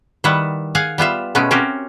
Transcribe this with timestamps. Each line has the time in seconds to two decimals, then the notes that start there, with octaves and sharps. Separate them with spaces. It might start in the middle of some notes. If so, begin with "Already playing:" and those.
0.24 D#3 G3 E4 B4 E5 F#5
0.75 G#4 F5 F#5 G#5
0.98 G3 B3 F4 E5
1.35 B2 G#3 A3 B3 C#4
1.51 C4 C#4 F#4 G4 A#4